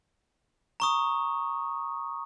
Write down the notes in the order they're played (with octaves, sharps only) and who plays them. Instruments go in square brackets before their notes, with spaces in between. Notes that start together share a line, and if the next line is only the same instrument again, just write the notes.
[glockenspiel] A#5 C#6 D#6